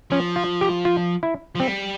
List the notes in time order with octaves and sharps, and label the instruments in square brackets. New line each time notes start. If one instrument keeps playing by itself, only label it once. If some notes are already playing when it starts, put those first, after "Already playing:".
[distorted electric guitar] F3 [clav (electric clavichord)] C#4
[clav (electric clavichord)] F4
G4
F4
E4
[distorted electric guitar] F3
[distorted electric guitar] G3 [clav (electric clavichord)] C4